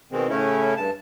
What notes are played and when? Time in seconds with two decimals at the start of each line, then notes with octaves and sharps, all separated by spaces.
0.12 B2 D#3 G#3 C4
0.29 A2 C#3 A3 C#4 E4
0.77 G2 A5